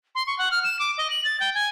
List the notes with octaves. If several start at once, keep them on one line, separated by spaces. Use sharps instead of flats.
C6
C#6
F#5
F6
E7
D6
D#5
F#7
A6
G5
G#5